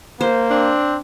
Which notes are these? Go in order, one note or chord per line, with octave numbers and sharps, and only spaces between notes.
A#3 C5
C4 D4